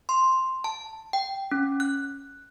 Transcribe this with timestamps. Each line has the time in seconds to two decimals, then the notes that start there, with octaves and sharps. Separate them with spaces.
0.09 C6
0.64 A5
1.13 G5
1.51 C#4
1.80 F#6